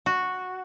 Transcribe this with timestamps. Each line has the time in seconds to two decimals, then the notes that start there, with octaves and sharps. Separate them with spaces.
0.06 F#4